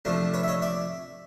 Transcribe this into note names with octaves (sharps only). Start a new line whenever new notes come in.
C3 F3 A3 D4
B4 C#5
E5
C#5 D#5
D5 E5